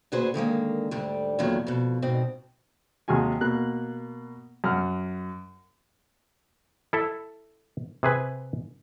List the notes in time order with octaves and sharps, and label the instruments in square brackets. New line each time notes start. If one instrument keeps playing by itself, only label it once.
[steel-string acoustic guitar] D2 A#2 F#4 G#4 B4 C5
D3 D#3 G#3 A#3
D2 G#2 D3 G3
E2 A#2 D3 D#3 F#3
F2 B2
G#2 B2 C4
[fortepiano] D#2 C3 G#3 F#4 G#5
B2 A#3 F#6
F#2 F#5 F6
[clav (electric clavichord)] E4 A4 E5
C3 G#4 B4 G#5